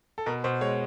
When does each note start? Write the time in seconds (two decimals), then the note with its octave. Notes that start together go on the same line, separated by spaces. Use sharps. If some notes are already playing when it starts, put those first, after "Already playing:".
0.18 A4
0.26 B2 A#4
0.44 B2 C5
0.61 G#3 C#5